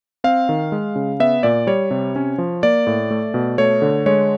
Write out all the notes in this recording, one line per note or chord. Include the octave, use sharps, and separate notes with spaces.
C4 F5
D#3
G#3
C#3
B3 E5
A#2 D5
G3 C#5
C3
C#4
F3
A#3 D5
A2
A3
B2
A3 C#5
D3
G#3 C#5